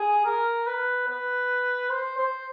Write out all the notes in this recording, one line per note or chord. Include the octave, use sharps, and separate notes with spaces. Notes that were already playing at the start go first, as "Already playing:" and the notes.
Already playing: G#4
A#4
B4
B4
C5
C5